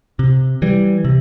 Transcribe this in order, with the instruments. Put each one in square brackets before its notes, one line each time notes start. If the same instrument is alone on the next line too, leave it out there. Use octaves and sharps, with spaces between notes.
[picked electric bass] C3
E3 G3
C3